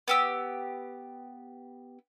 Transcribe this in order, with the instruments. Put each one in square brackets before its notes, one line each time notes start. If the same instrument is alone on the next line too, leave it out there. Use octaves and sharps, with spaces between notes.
[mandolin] B3 G4 E6